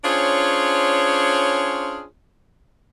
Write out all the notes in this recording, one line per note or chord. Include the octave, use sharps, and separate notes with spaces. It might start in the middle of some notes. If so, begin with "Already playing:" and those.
C#4 D4 F4 G#4 C5 C#5